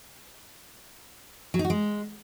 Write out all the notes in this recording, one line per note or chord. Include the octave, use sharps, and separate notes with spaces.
F#3
D#4
F#4
G#3